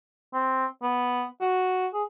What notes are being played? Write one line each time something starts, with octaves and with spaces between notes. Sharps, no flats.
C4
B3
F#4
G#4